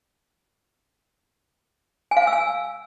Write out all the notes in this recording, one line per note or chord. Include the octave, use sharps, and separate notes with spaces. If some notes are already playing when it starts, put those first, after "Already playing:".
G#5
F5
G#5
E6
G#5